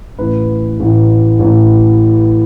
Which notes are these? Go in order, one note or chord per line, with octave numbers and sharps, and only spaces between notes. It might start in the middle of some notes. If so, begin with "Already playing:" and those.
A1 A2 E3 B4
A1 A2 E3
A1 A2 E3